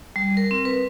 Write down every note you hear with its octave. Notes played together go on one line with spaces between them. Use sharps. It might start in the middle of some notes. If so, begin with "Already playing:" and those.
G3
A#4
C4
B4